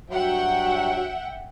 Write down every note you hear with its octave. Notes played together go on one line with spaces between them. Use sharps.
G2 F#3 E5 F#5 G5